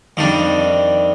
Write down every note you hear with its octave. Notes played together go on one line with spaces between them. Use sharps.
F2 D#3 G3 D4